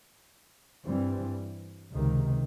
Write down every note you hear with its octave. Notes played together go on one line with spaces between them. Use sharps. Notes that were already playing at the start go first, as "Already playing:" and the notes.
G2 E3 G3 C4
C#2 C3 D#3